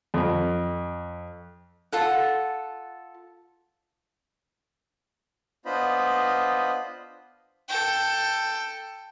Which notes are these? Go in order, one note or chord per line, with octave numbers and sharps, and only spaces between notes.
F2
F4 A4 F#5
B3 D4 F4 C5 D#5 B5
A4 G5